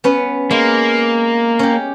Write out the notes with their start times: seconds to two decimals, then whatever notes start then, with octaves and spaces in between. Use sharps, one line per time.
0.04 B3 C#4 B4
0.51 G#3 A#3
1.59 C#4 G4